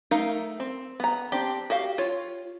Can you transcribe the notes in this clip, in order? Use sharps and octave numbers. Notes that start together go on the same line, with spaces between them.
A3 D#4 A#4 F5
C4
B3 A#5
C4 D4 G4
F#4 G4 F5
F4 C#5